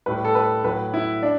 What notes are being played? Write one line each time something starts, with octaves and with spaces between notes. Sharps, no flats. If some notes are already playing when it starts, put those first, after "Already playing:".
A2 G3 B4
A4
B4
A2 F#3 B4
E4
D4